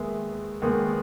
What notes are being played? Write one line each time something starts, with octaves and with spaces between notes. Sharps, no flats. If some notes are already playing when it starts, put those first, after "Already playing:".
Already playing: D#2 D#3 G#3 B3 E5
D#2 D#3 G#3 B3